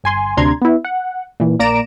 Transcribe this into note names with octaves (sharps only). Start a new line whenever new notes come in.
G1 G#5 C6
D2 C3 D4 A#5 C6 G#6
B3 E4
F#5
A#2 E3
A#1 A#3 D5 A#5 D7 E7